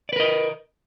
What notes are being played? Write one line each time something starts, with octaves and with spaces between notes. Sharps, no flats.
A#4 B4 D5 D#5